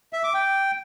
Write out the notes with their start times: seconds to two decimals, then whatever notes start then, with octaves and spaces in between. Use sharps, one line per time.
0.13 E5
0.24 D6
0.34 G5